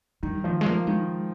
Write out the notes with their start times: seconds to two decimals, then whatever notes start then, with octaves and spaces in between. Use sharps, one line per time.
0.23 D#3 G3
0.44 D#3 F3
0.61 G#3
0.66 F3 A#3
0.87 D#3 G#3